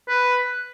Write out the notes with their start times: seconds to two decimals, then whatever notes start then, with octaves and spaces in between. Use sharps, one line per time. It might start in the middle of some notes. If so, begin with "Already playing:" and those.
0.09 B4